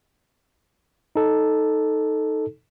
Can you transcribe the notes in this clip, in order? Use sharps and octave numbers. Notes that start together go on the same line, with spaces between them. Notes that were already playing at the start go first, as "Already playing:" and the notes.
D#4 A4